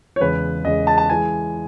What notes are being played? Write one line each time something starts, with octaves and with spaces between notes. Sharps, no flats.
C#5
E2 C#3 G#3 B4
E2 C#3 G#3 D#5
A5
A5
E3 G#3 G#5